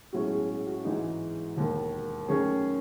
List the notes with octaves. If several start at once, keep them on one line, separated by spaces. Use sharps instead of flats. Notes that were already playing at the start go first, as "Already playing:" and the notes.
B1 A2 G#3 C#4 F#4
G#4
G#4
F#4
G#2 E3 G#3 D#4
E1 D#2 D#3
F#2 D#3 A3 C#4 G#4